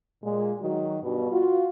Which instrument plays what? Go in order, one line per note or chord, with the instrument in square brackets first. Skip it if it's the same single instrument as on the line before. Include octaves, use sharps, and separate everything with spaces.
[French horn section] A#2 G#3
D#3 F#3 F#4
G2 B2
F4 F#4